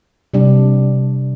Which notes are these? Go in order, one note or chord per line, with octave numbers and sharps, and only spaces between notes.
C3 G3 D4 G4